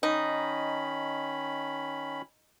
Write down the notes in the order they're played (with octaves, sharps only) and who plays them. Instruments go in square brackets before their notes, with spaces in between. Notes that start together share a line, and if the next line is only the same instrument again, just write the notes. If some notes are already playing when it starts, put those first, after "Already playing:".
[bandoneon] D#3 C#4 B5 [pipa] D#4